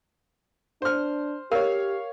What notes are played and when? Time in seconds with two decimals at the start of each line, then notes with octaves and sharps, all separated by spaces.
0.82 D4 C5 F6
1.52 G4 A#4 C#5 F5